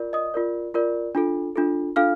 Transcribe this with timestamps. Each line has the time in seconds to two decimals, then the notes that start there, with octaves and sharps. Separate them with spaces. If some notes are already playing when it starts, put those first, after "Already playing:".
Already playing: F4 A#4 D5
0.13 D#5 D#6
0.34 F4 A#4 D5
0.74 F4 A#4 D5
1.15 D4 F4 A4
1.56 D4 F4 A4
1.96 D4 F4 A4 F5 F6